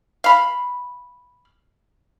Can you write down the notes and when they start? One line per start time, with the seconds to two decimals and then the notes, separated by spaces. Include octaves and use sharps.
0.24 F5 B5